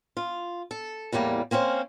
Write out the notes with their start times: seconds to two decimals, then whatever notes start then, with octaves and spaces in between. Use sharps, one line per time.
0.17 F4
0.71 A4
1.12 E2 A2 G3 A#3
1.51 A#3 C4 C#4 A4 C5